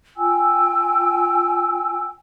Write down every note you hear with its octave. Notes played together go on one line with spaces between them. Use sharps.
F4 G5 G#5 E6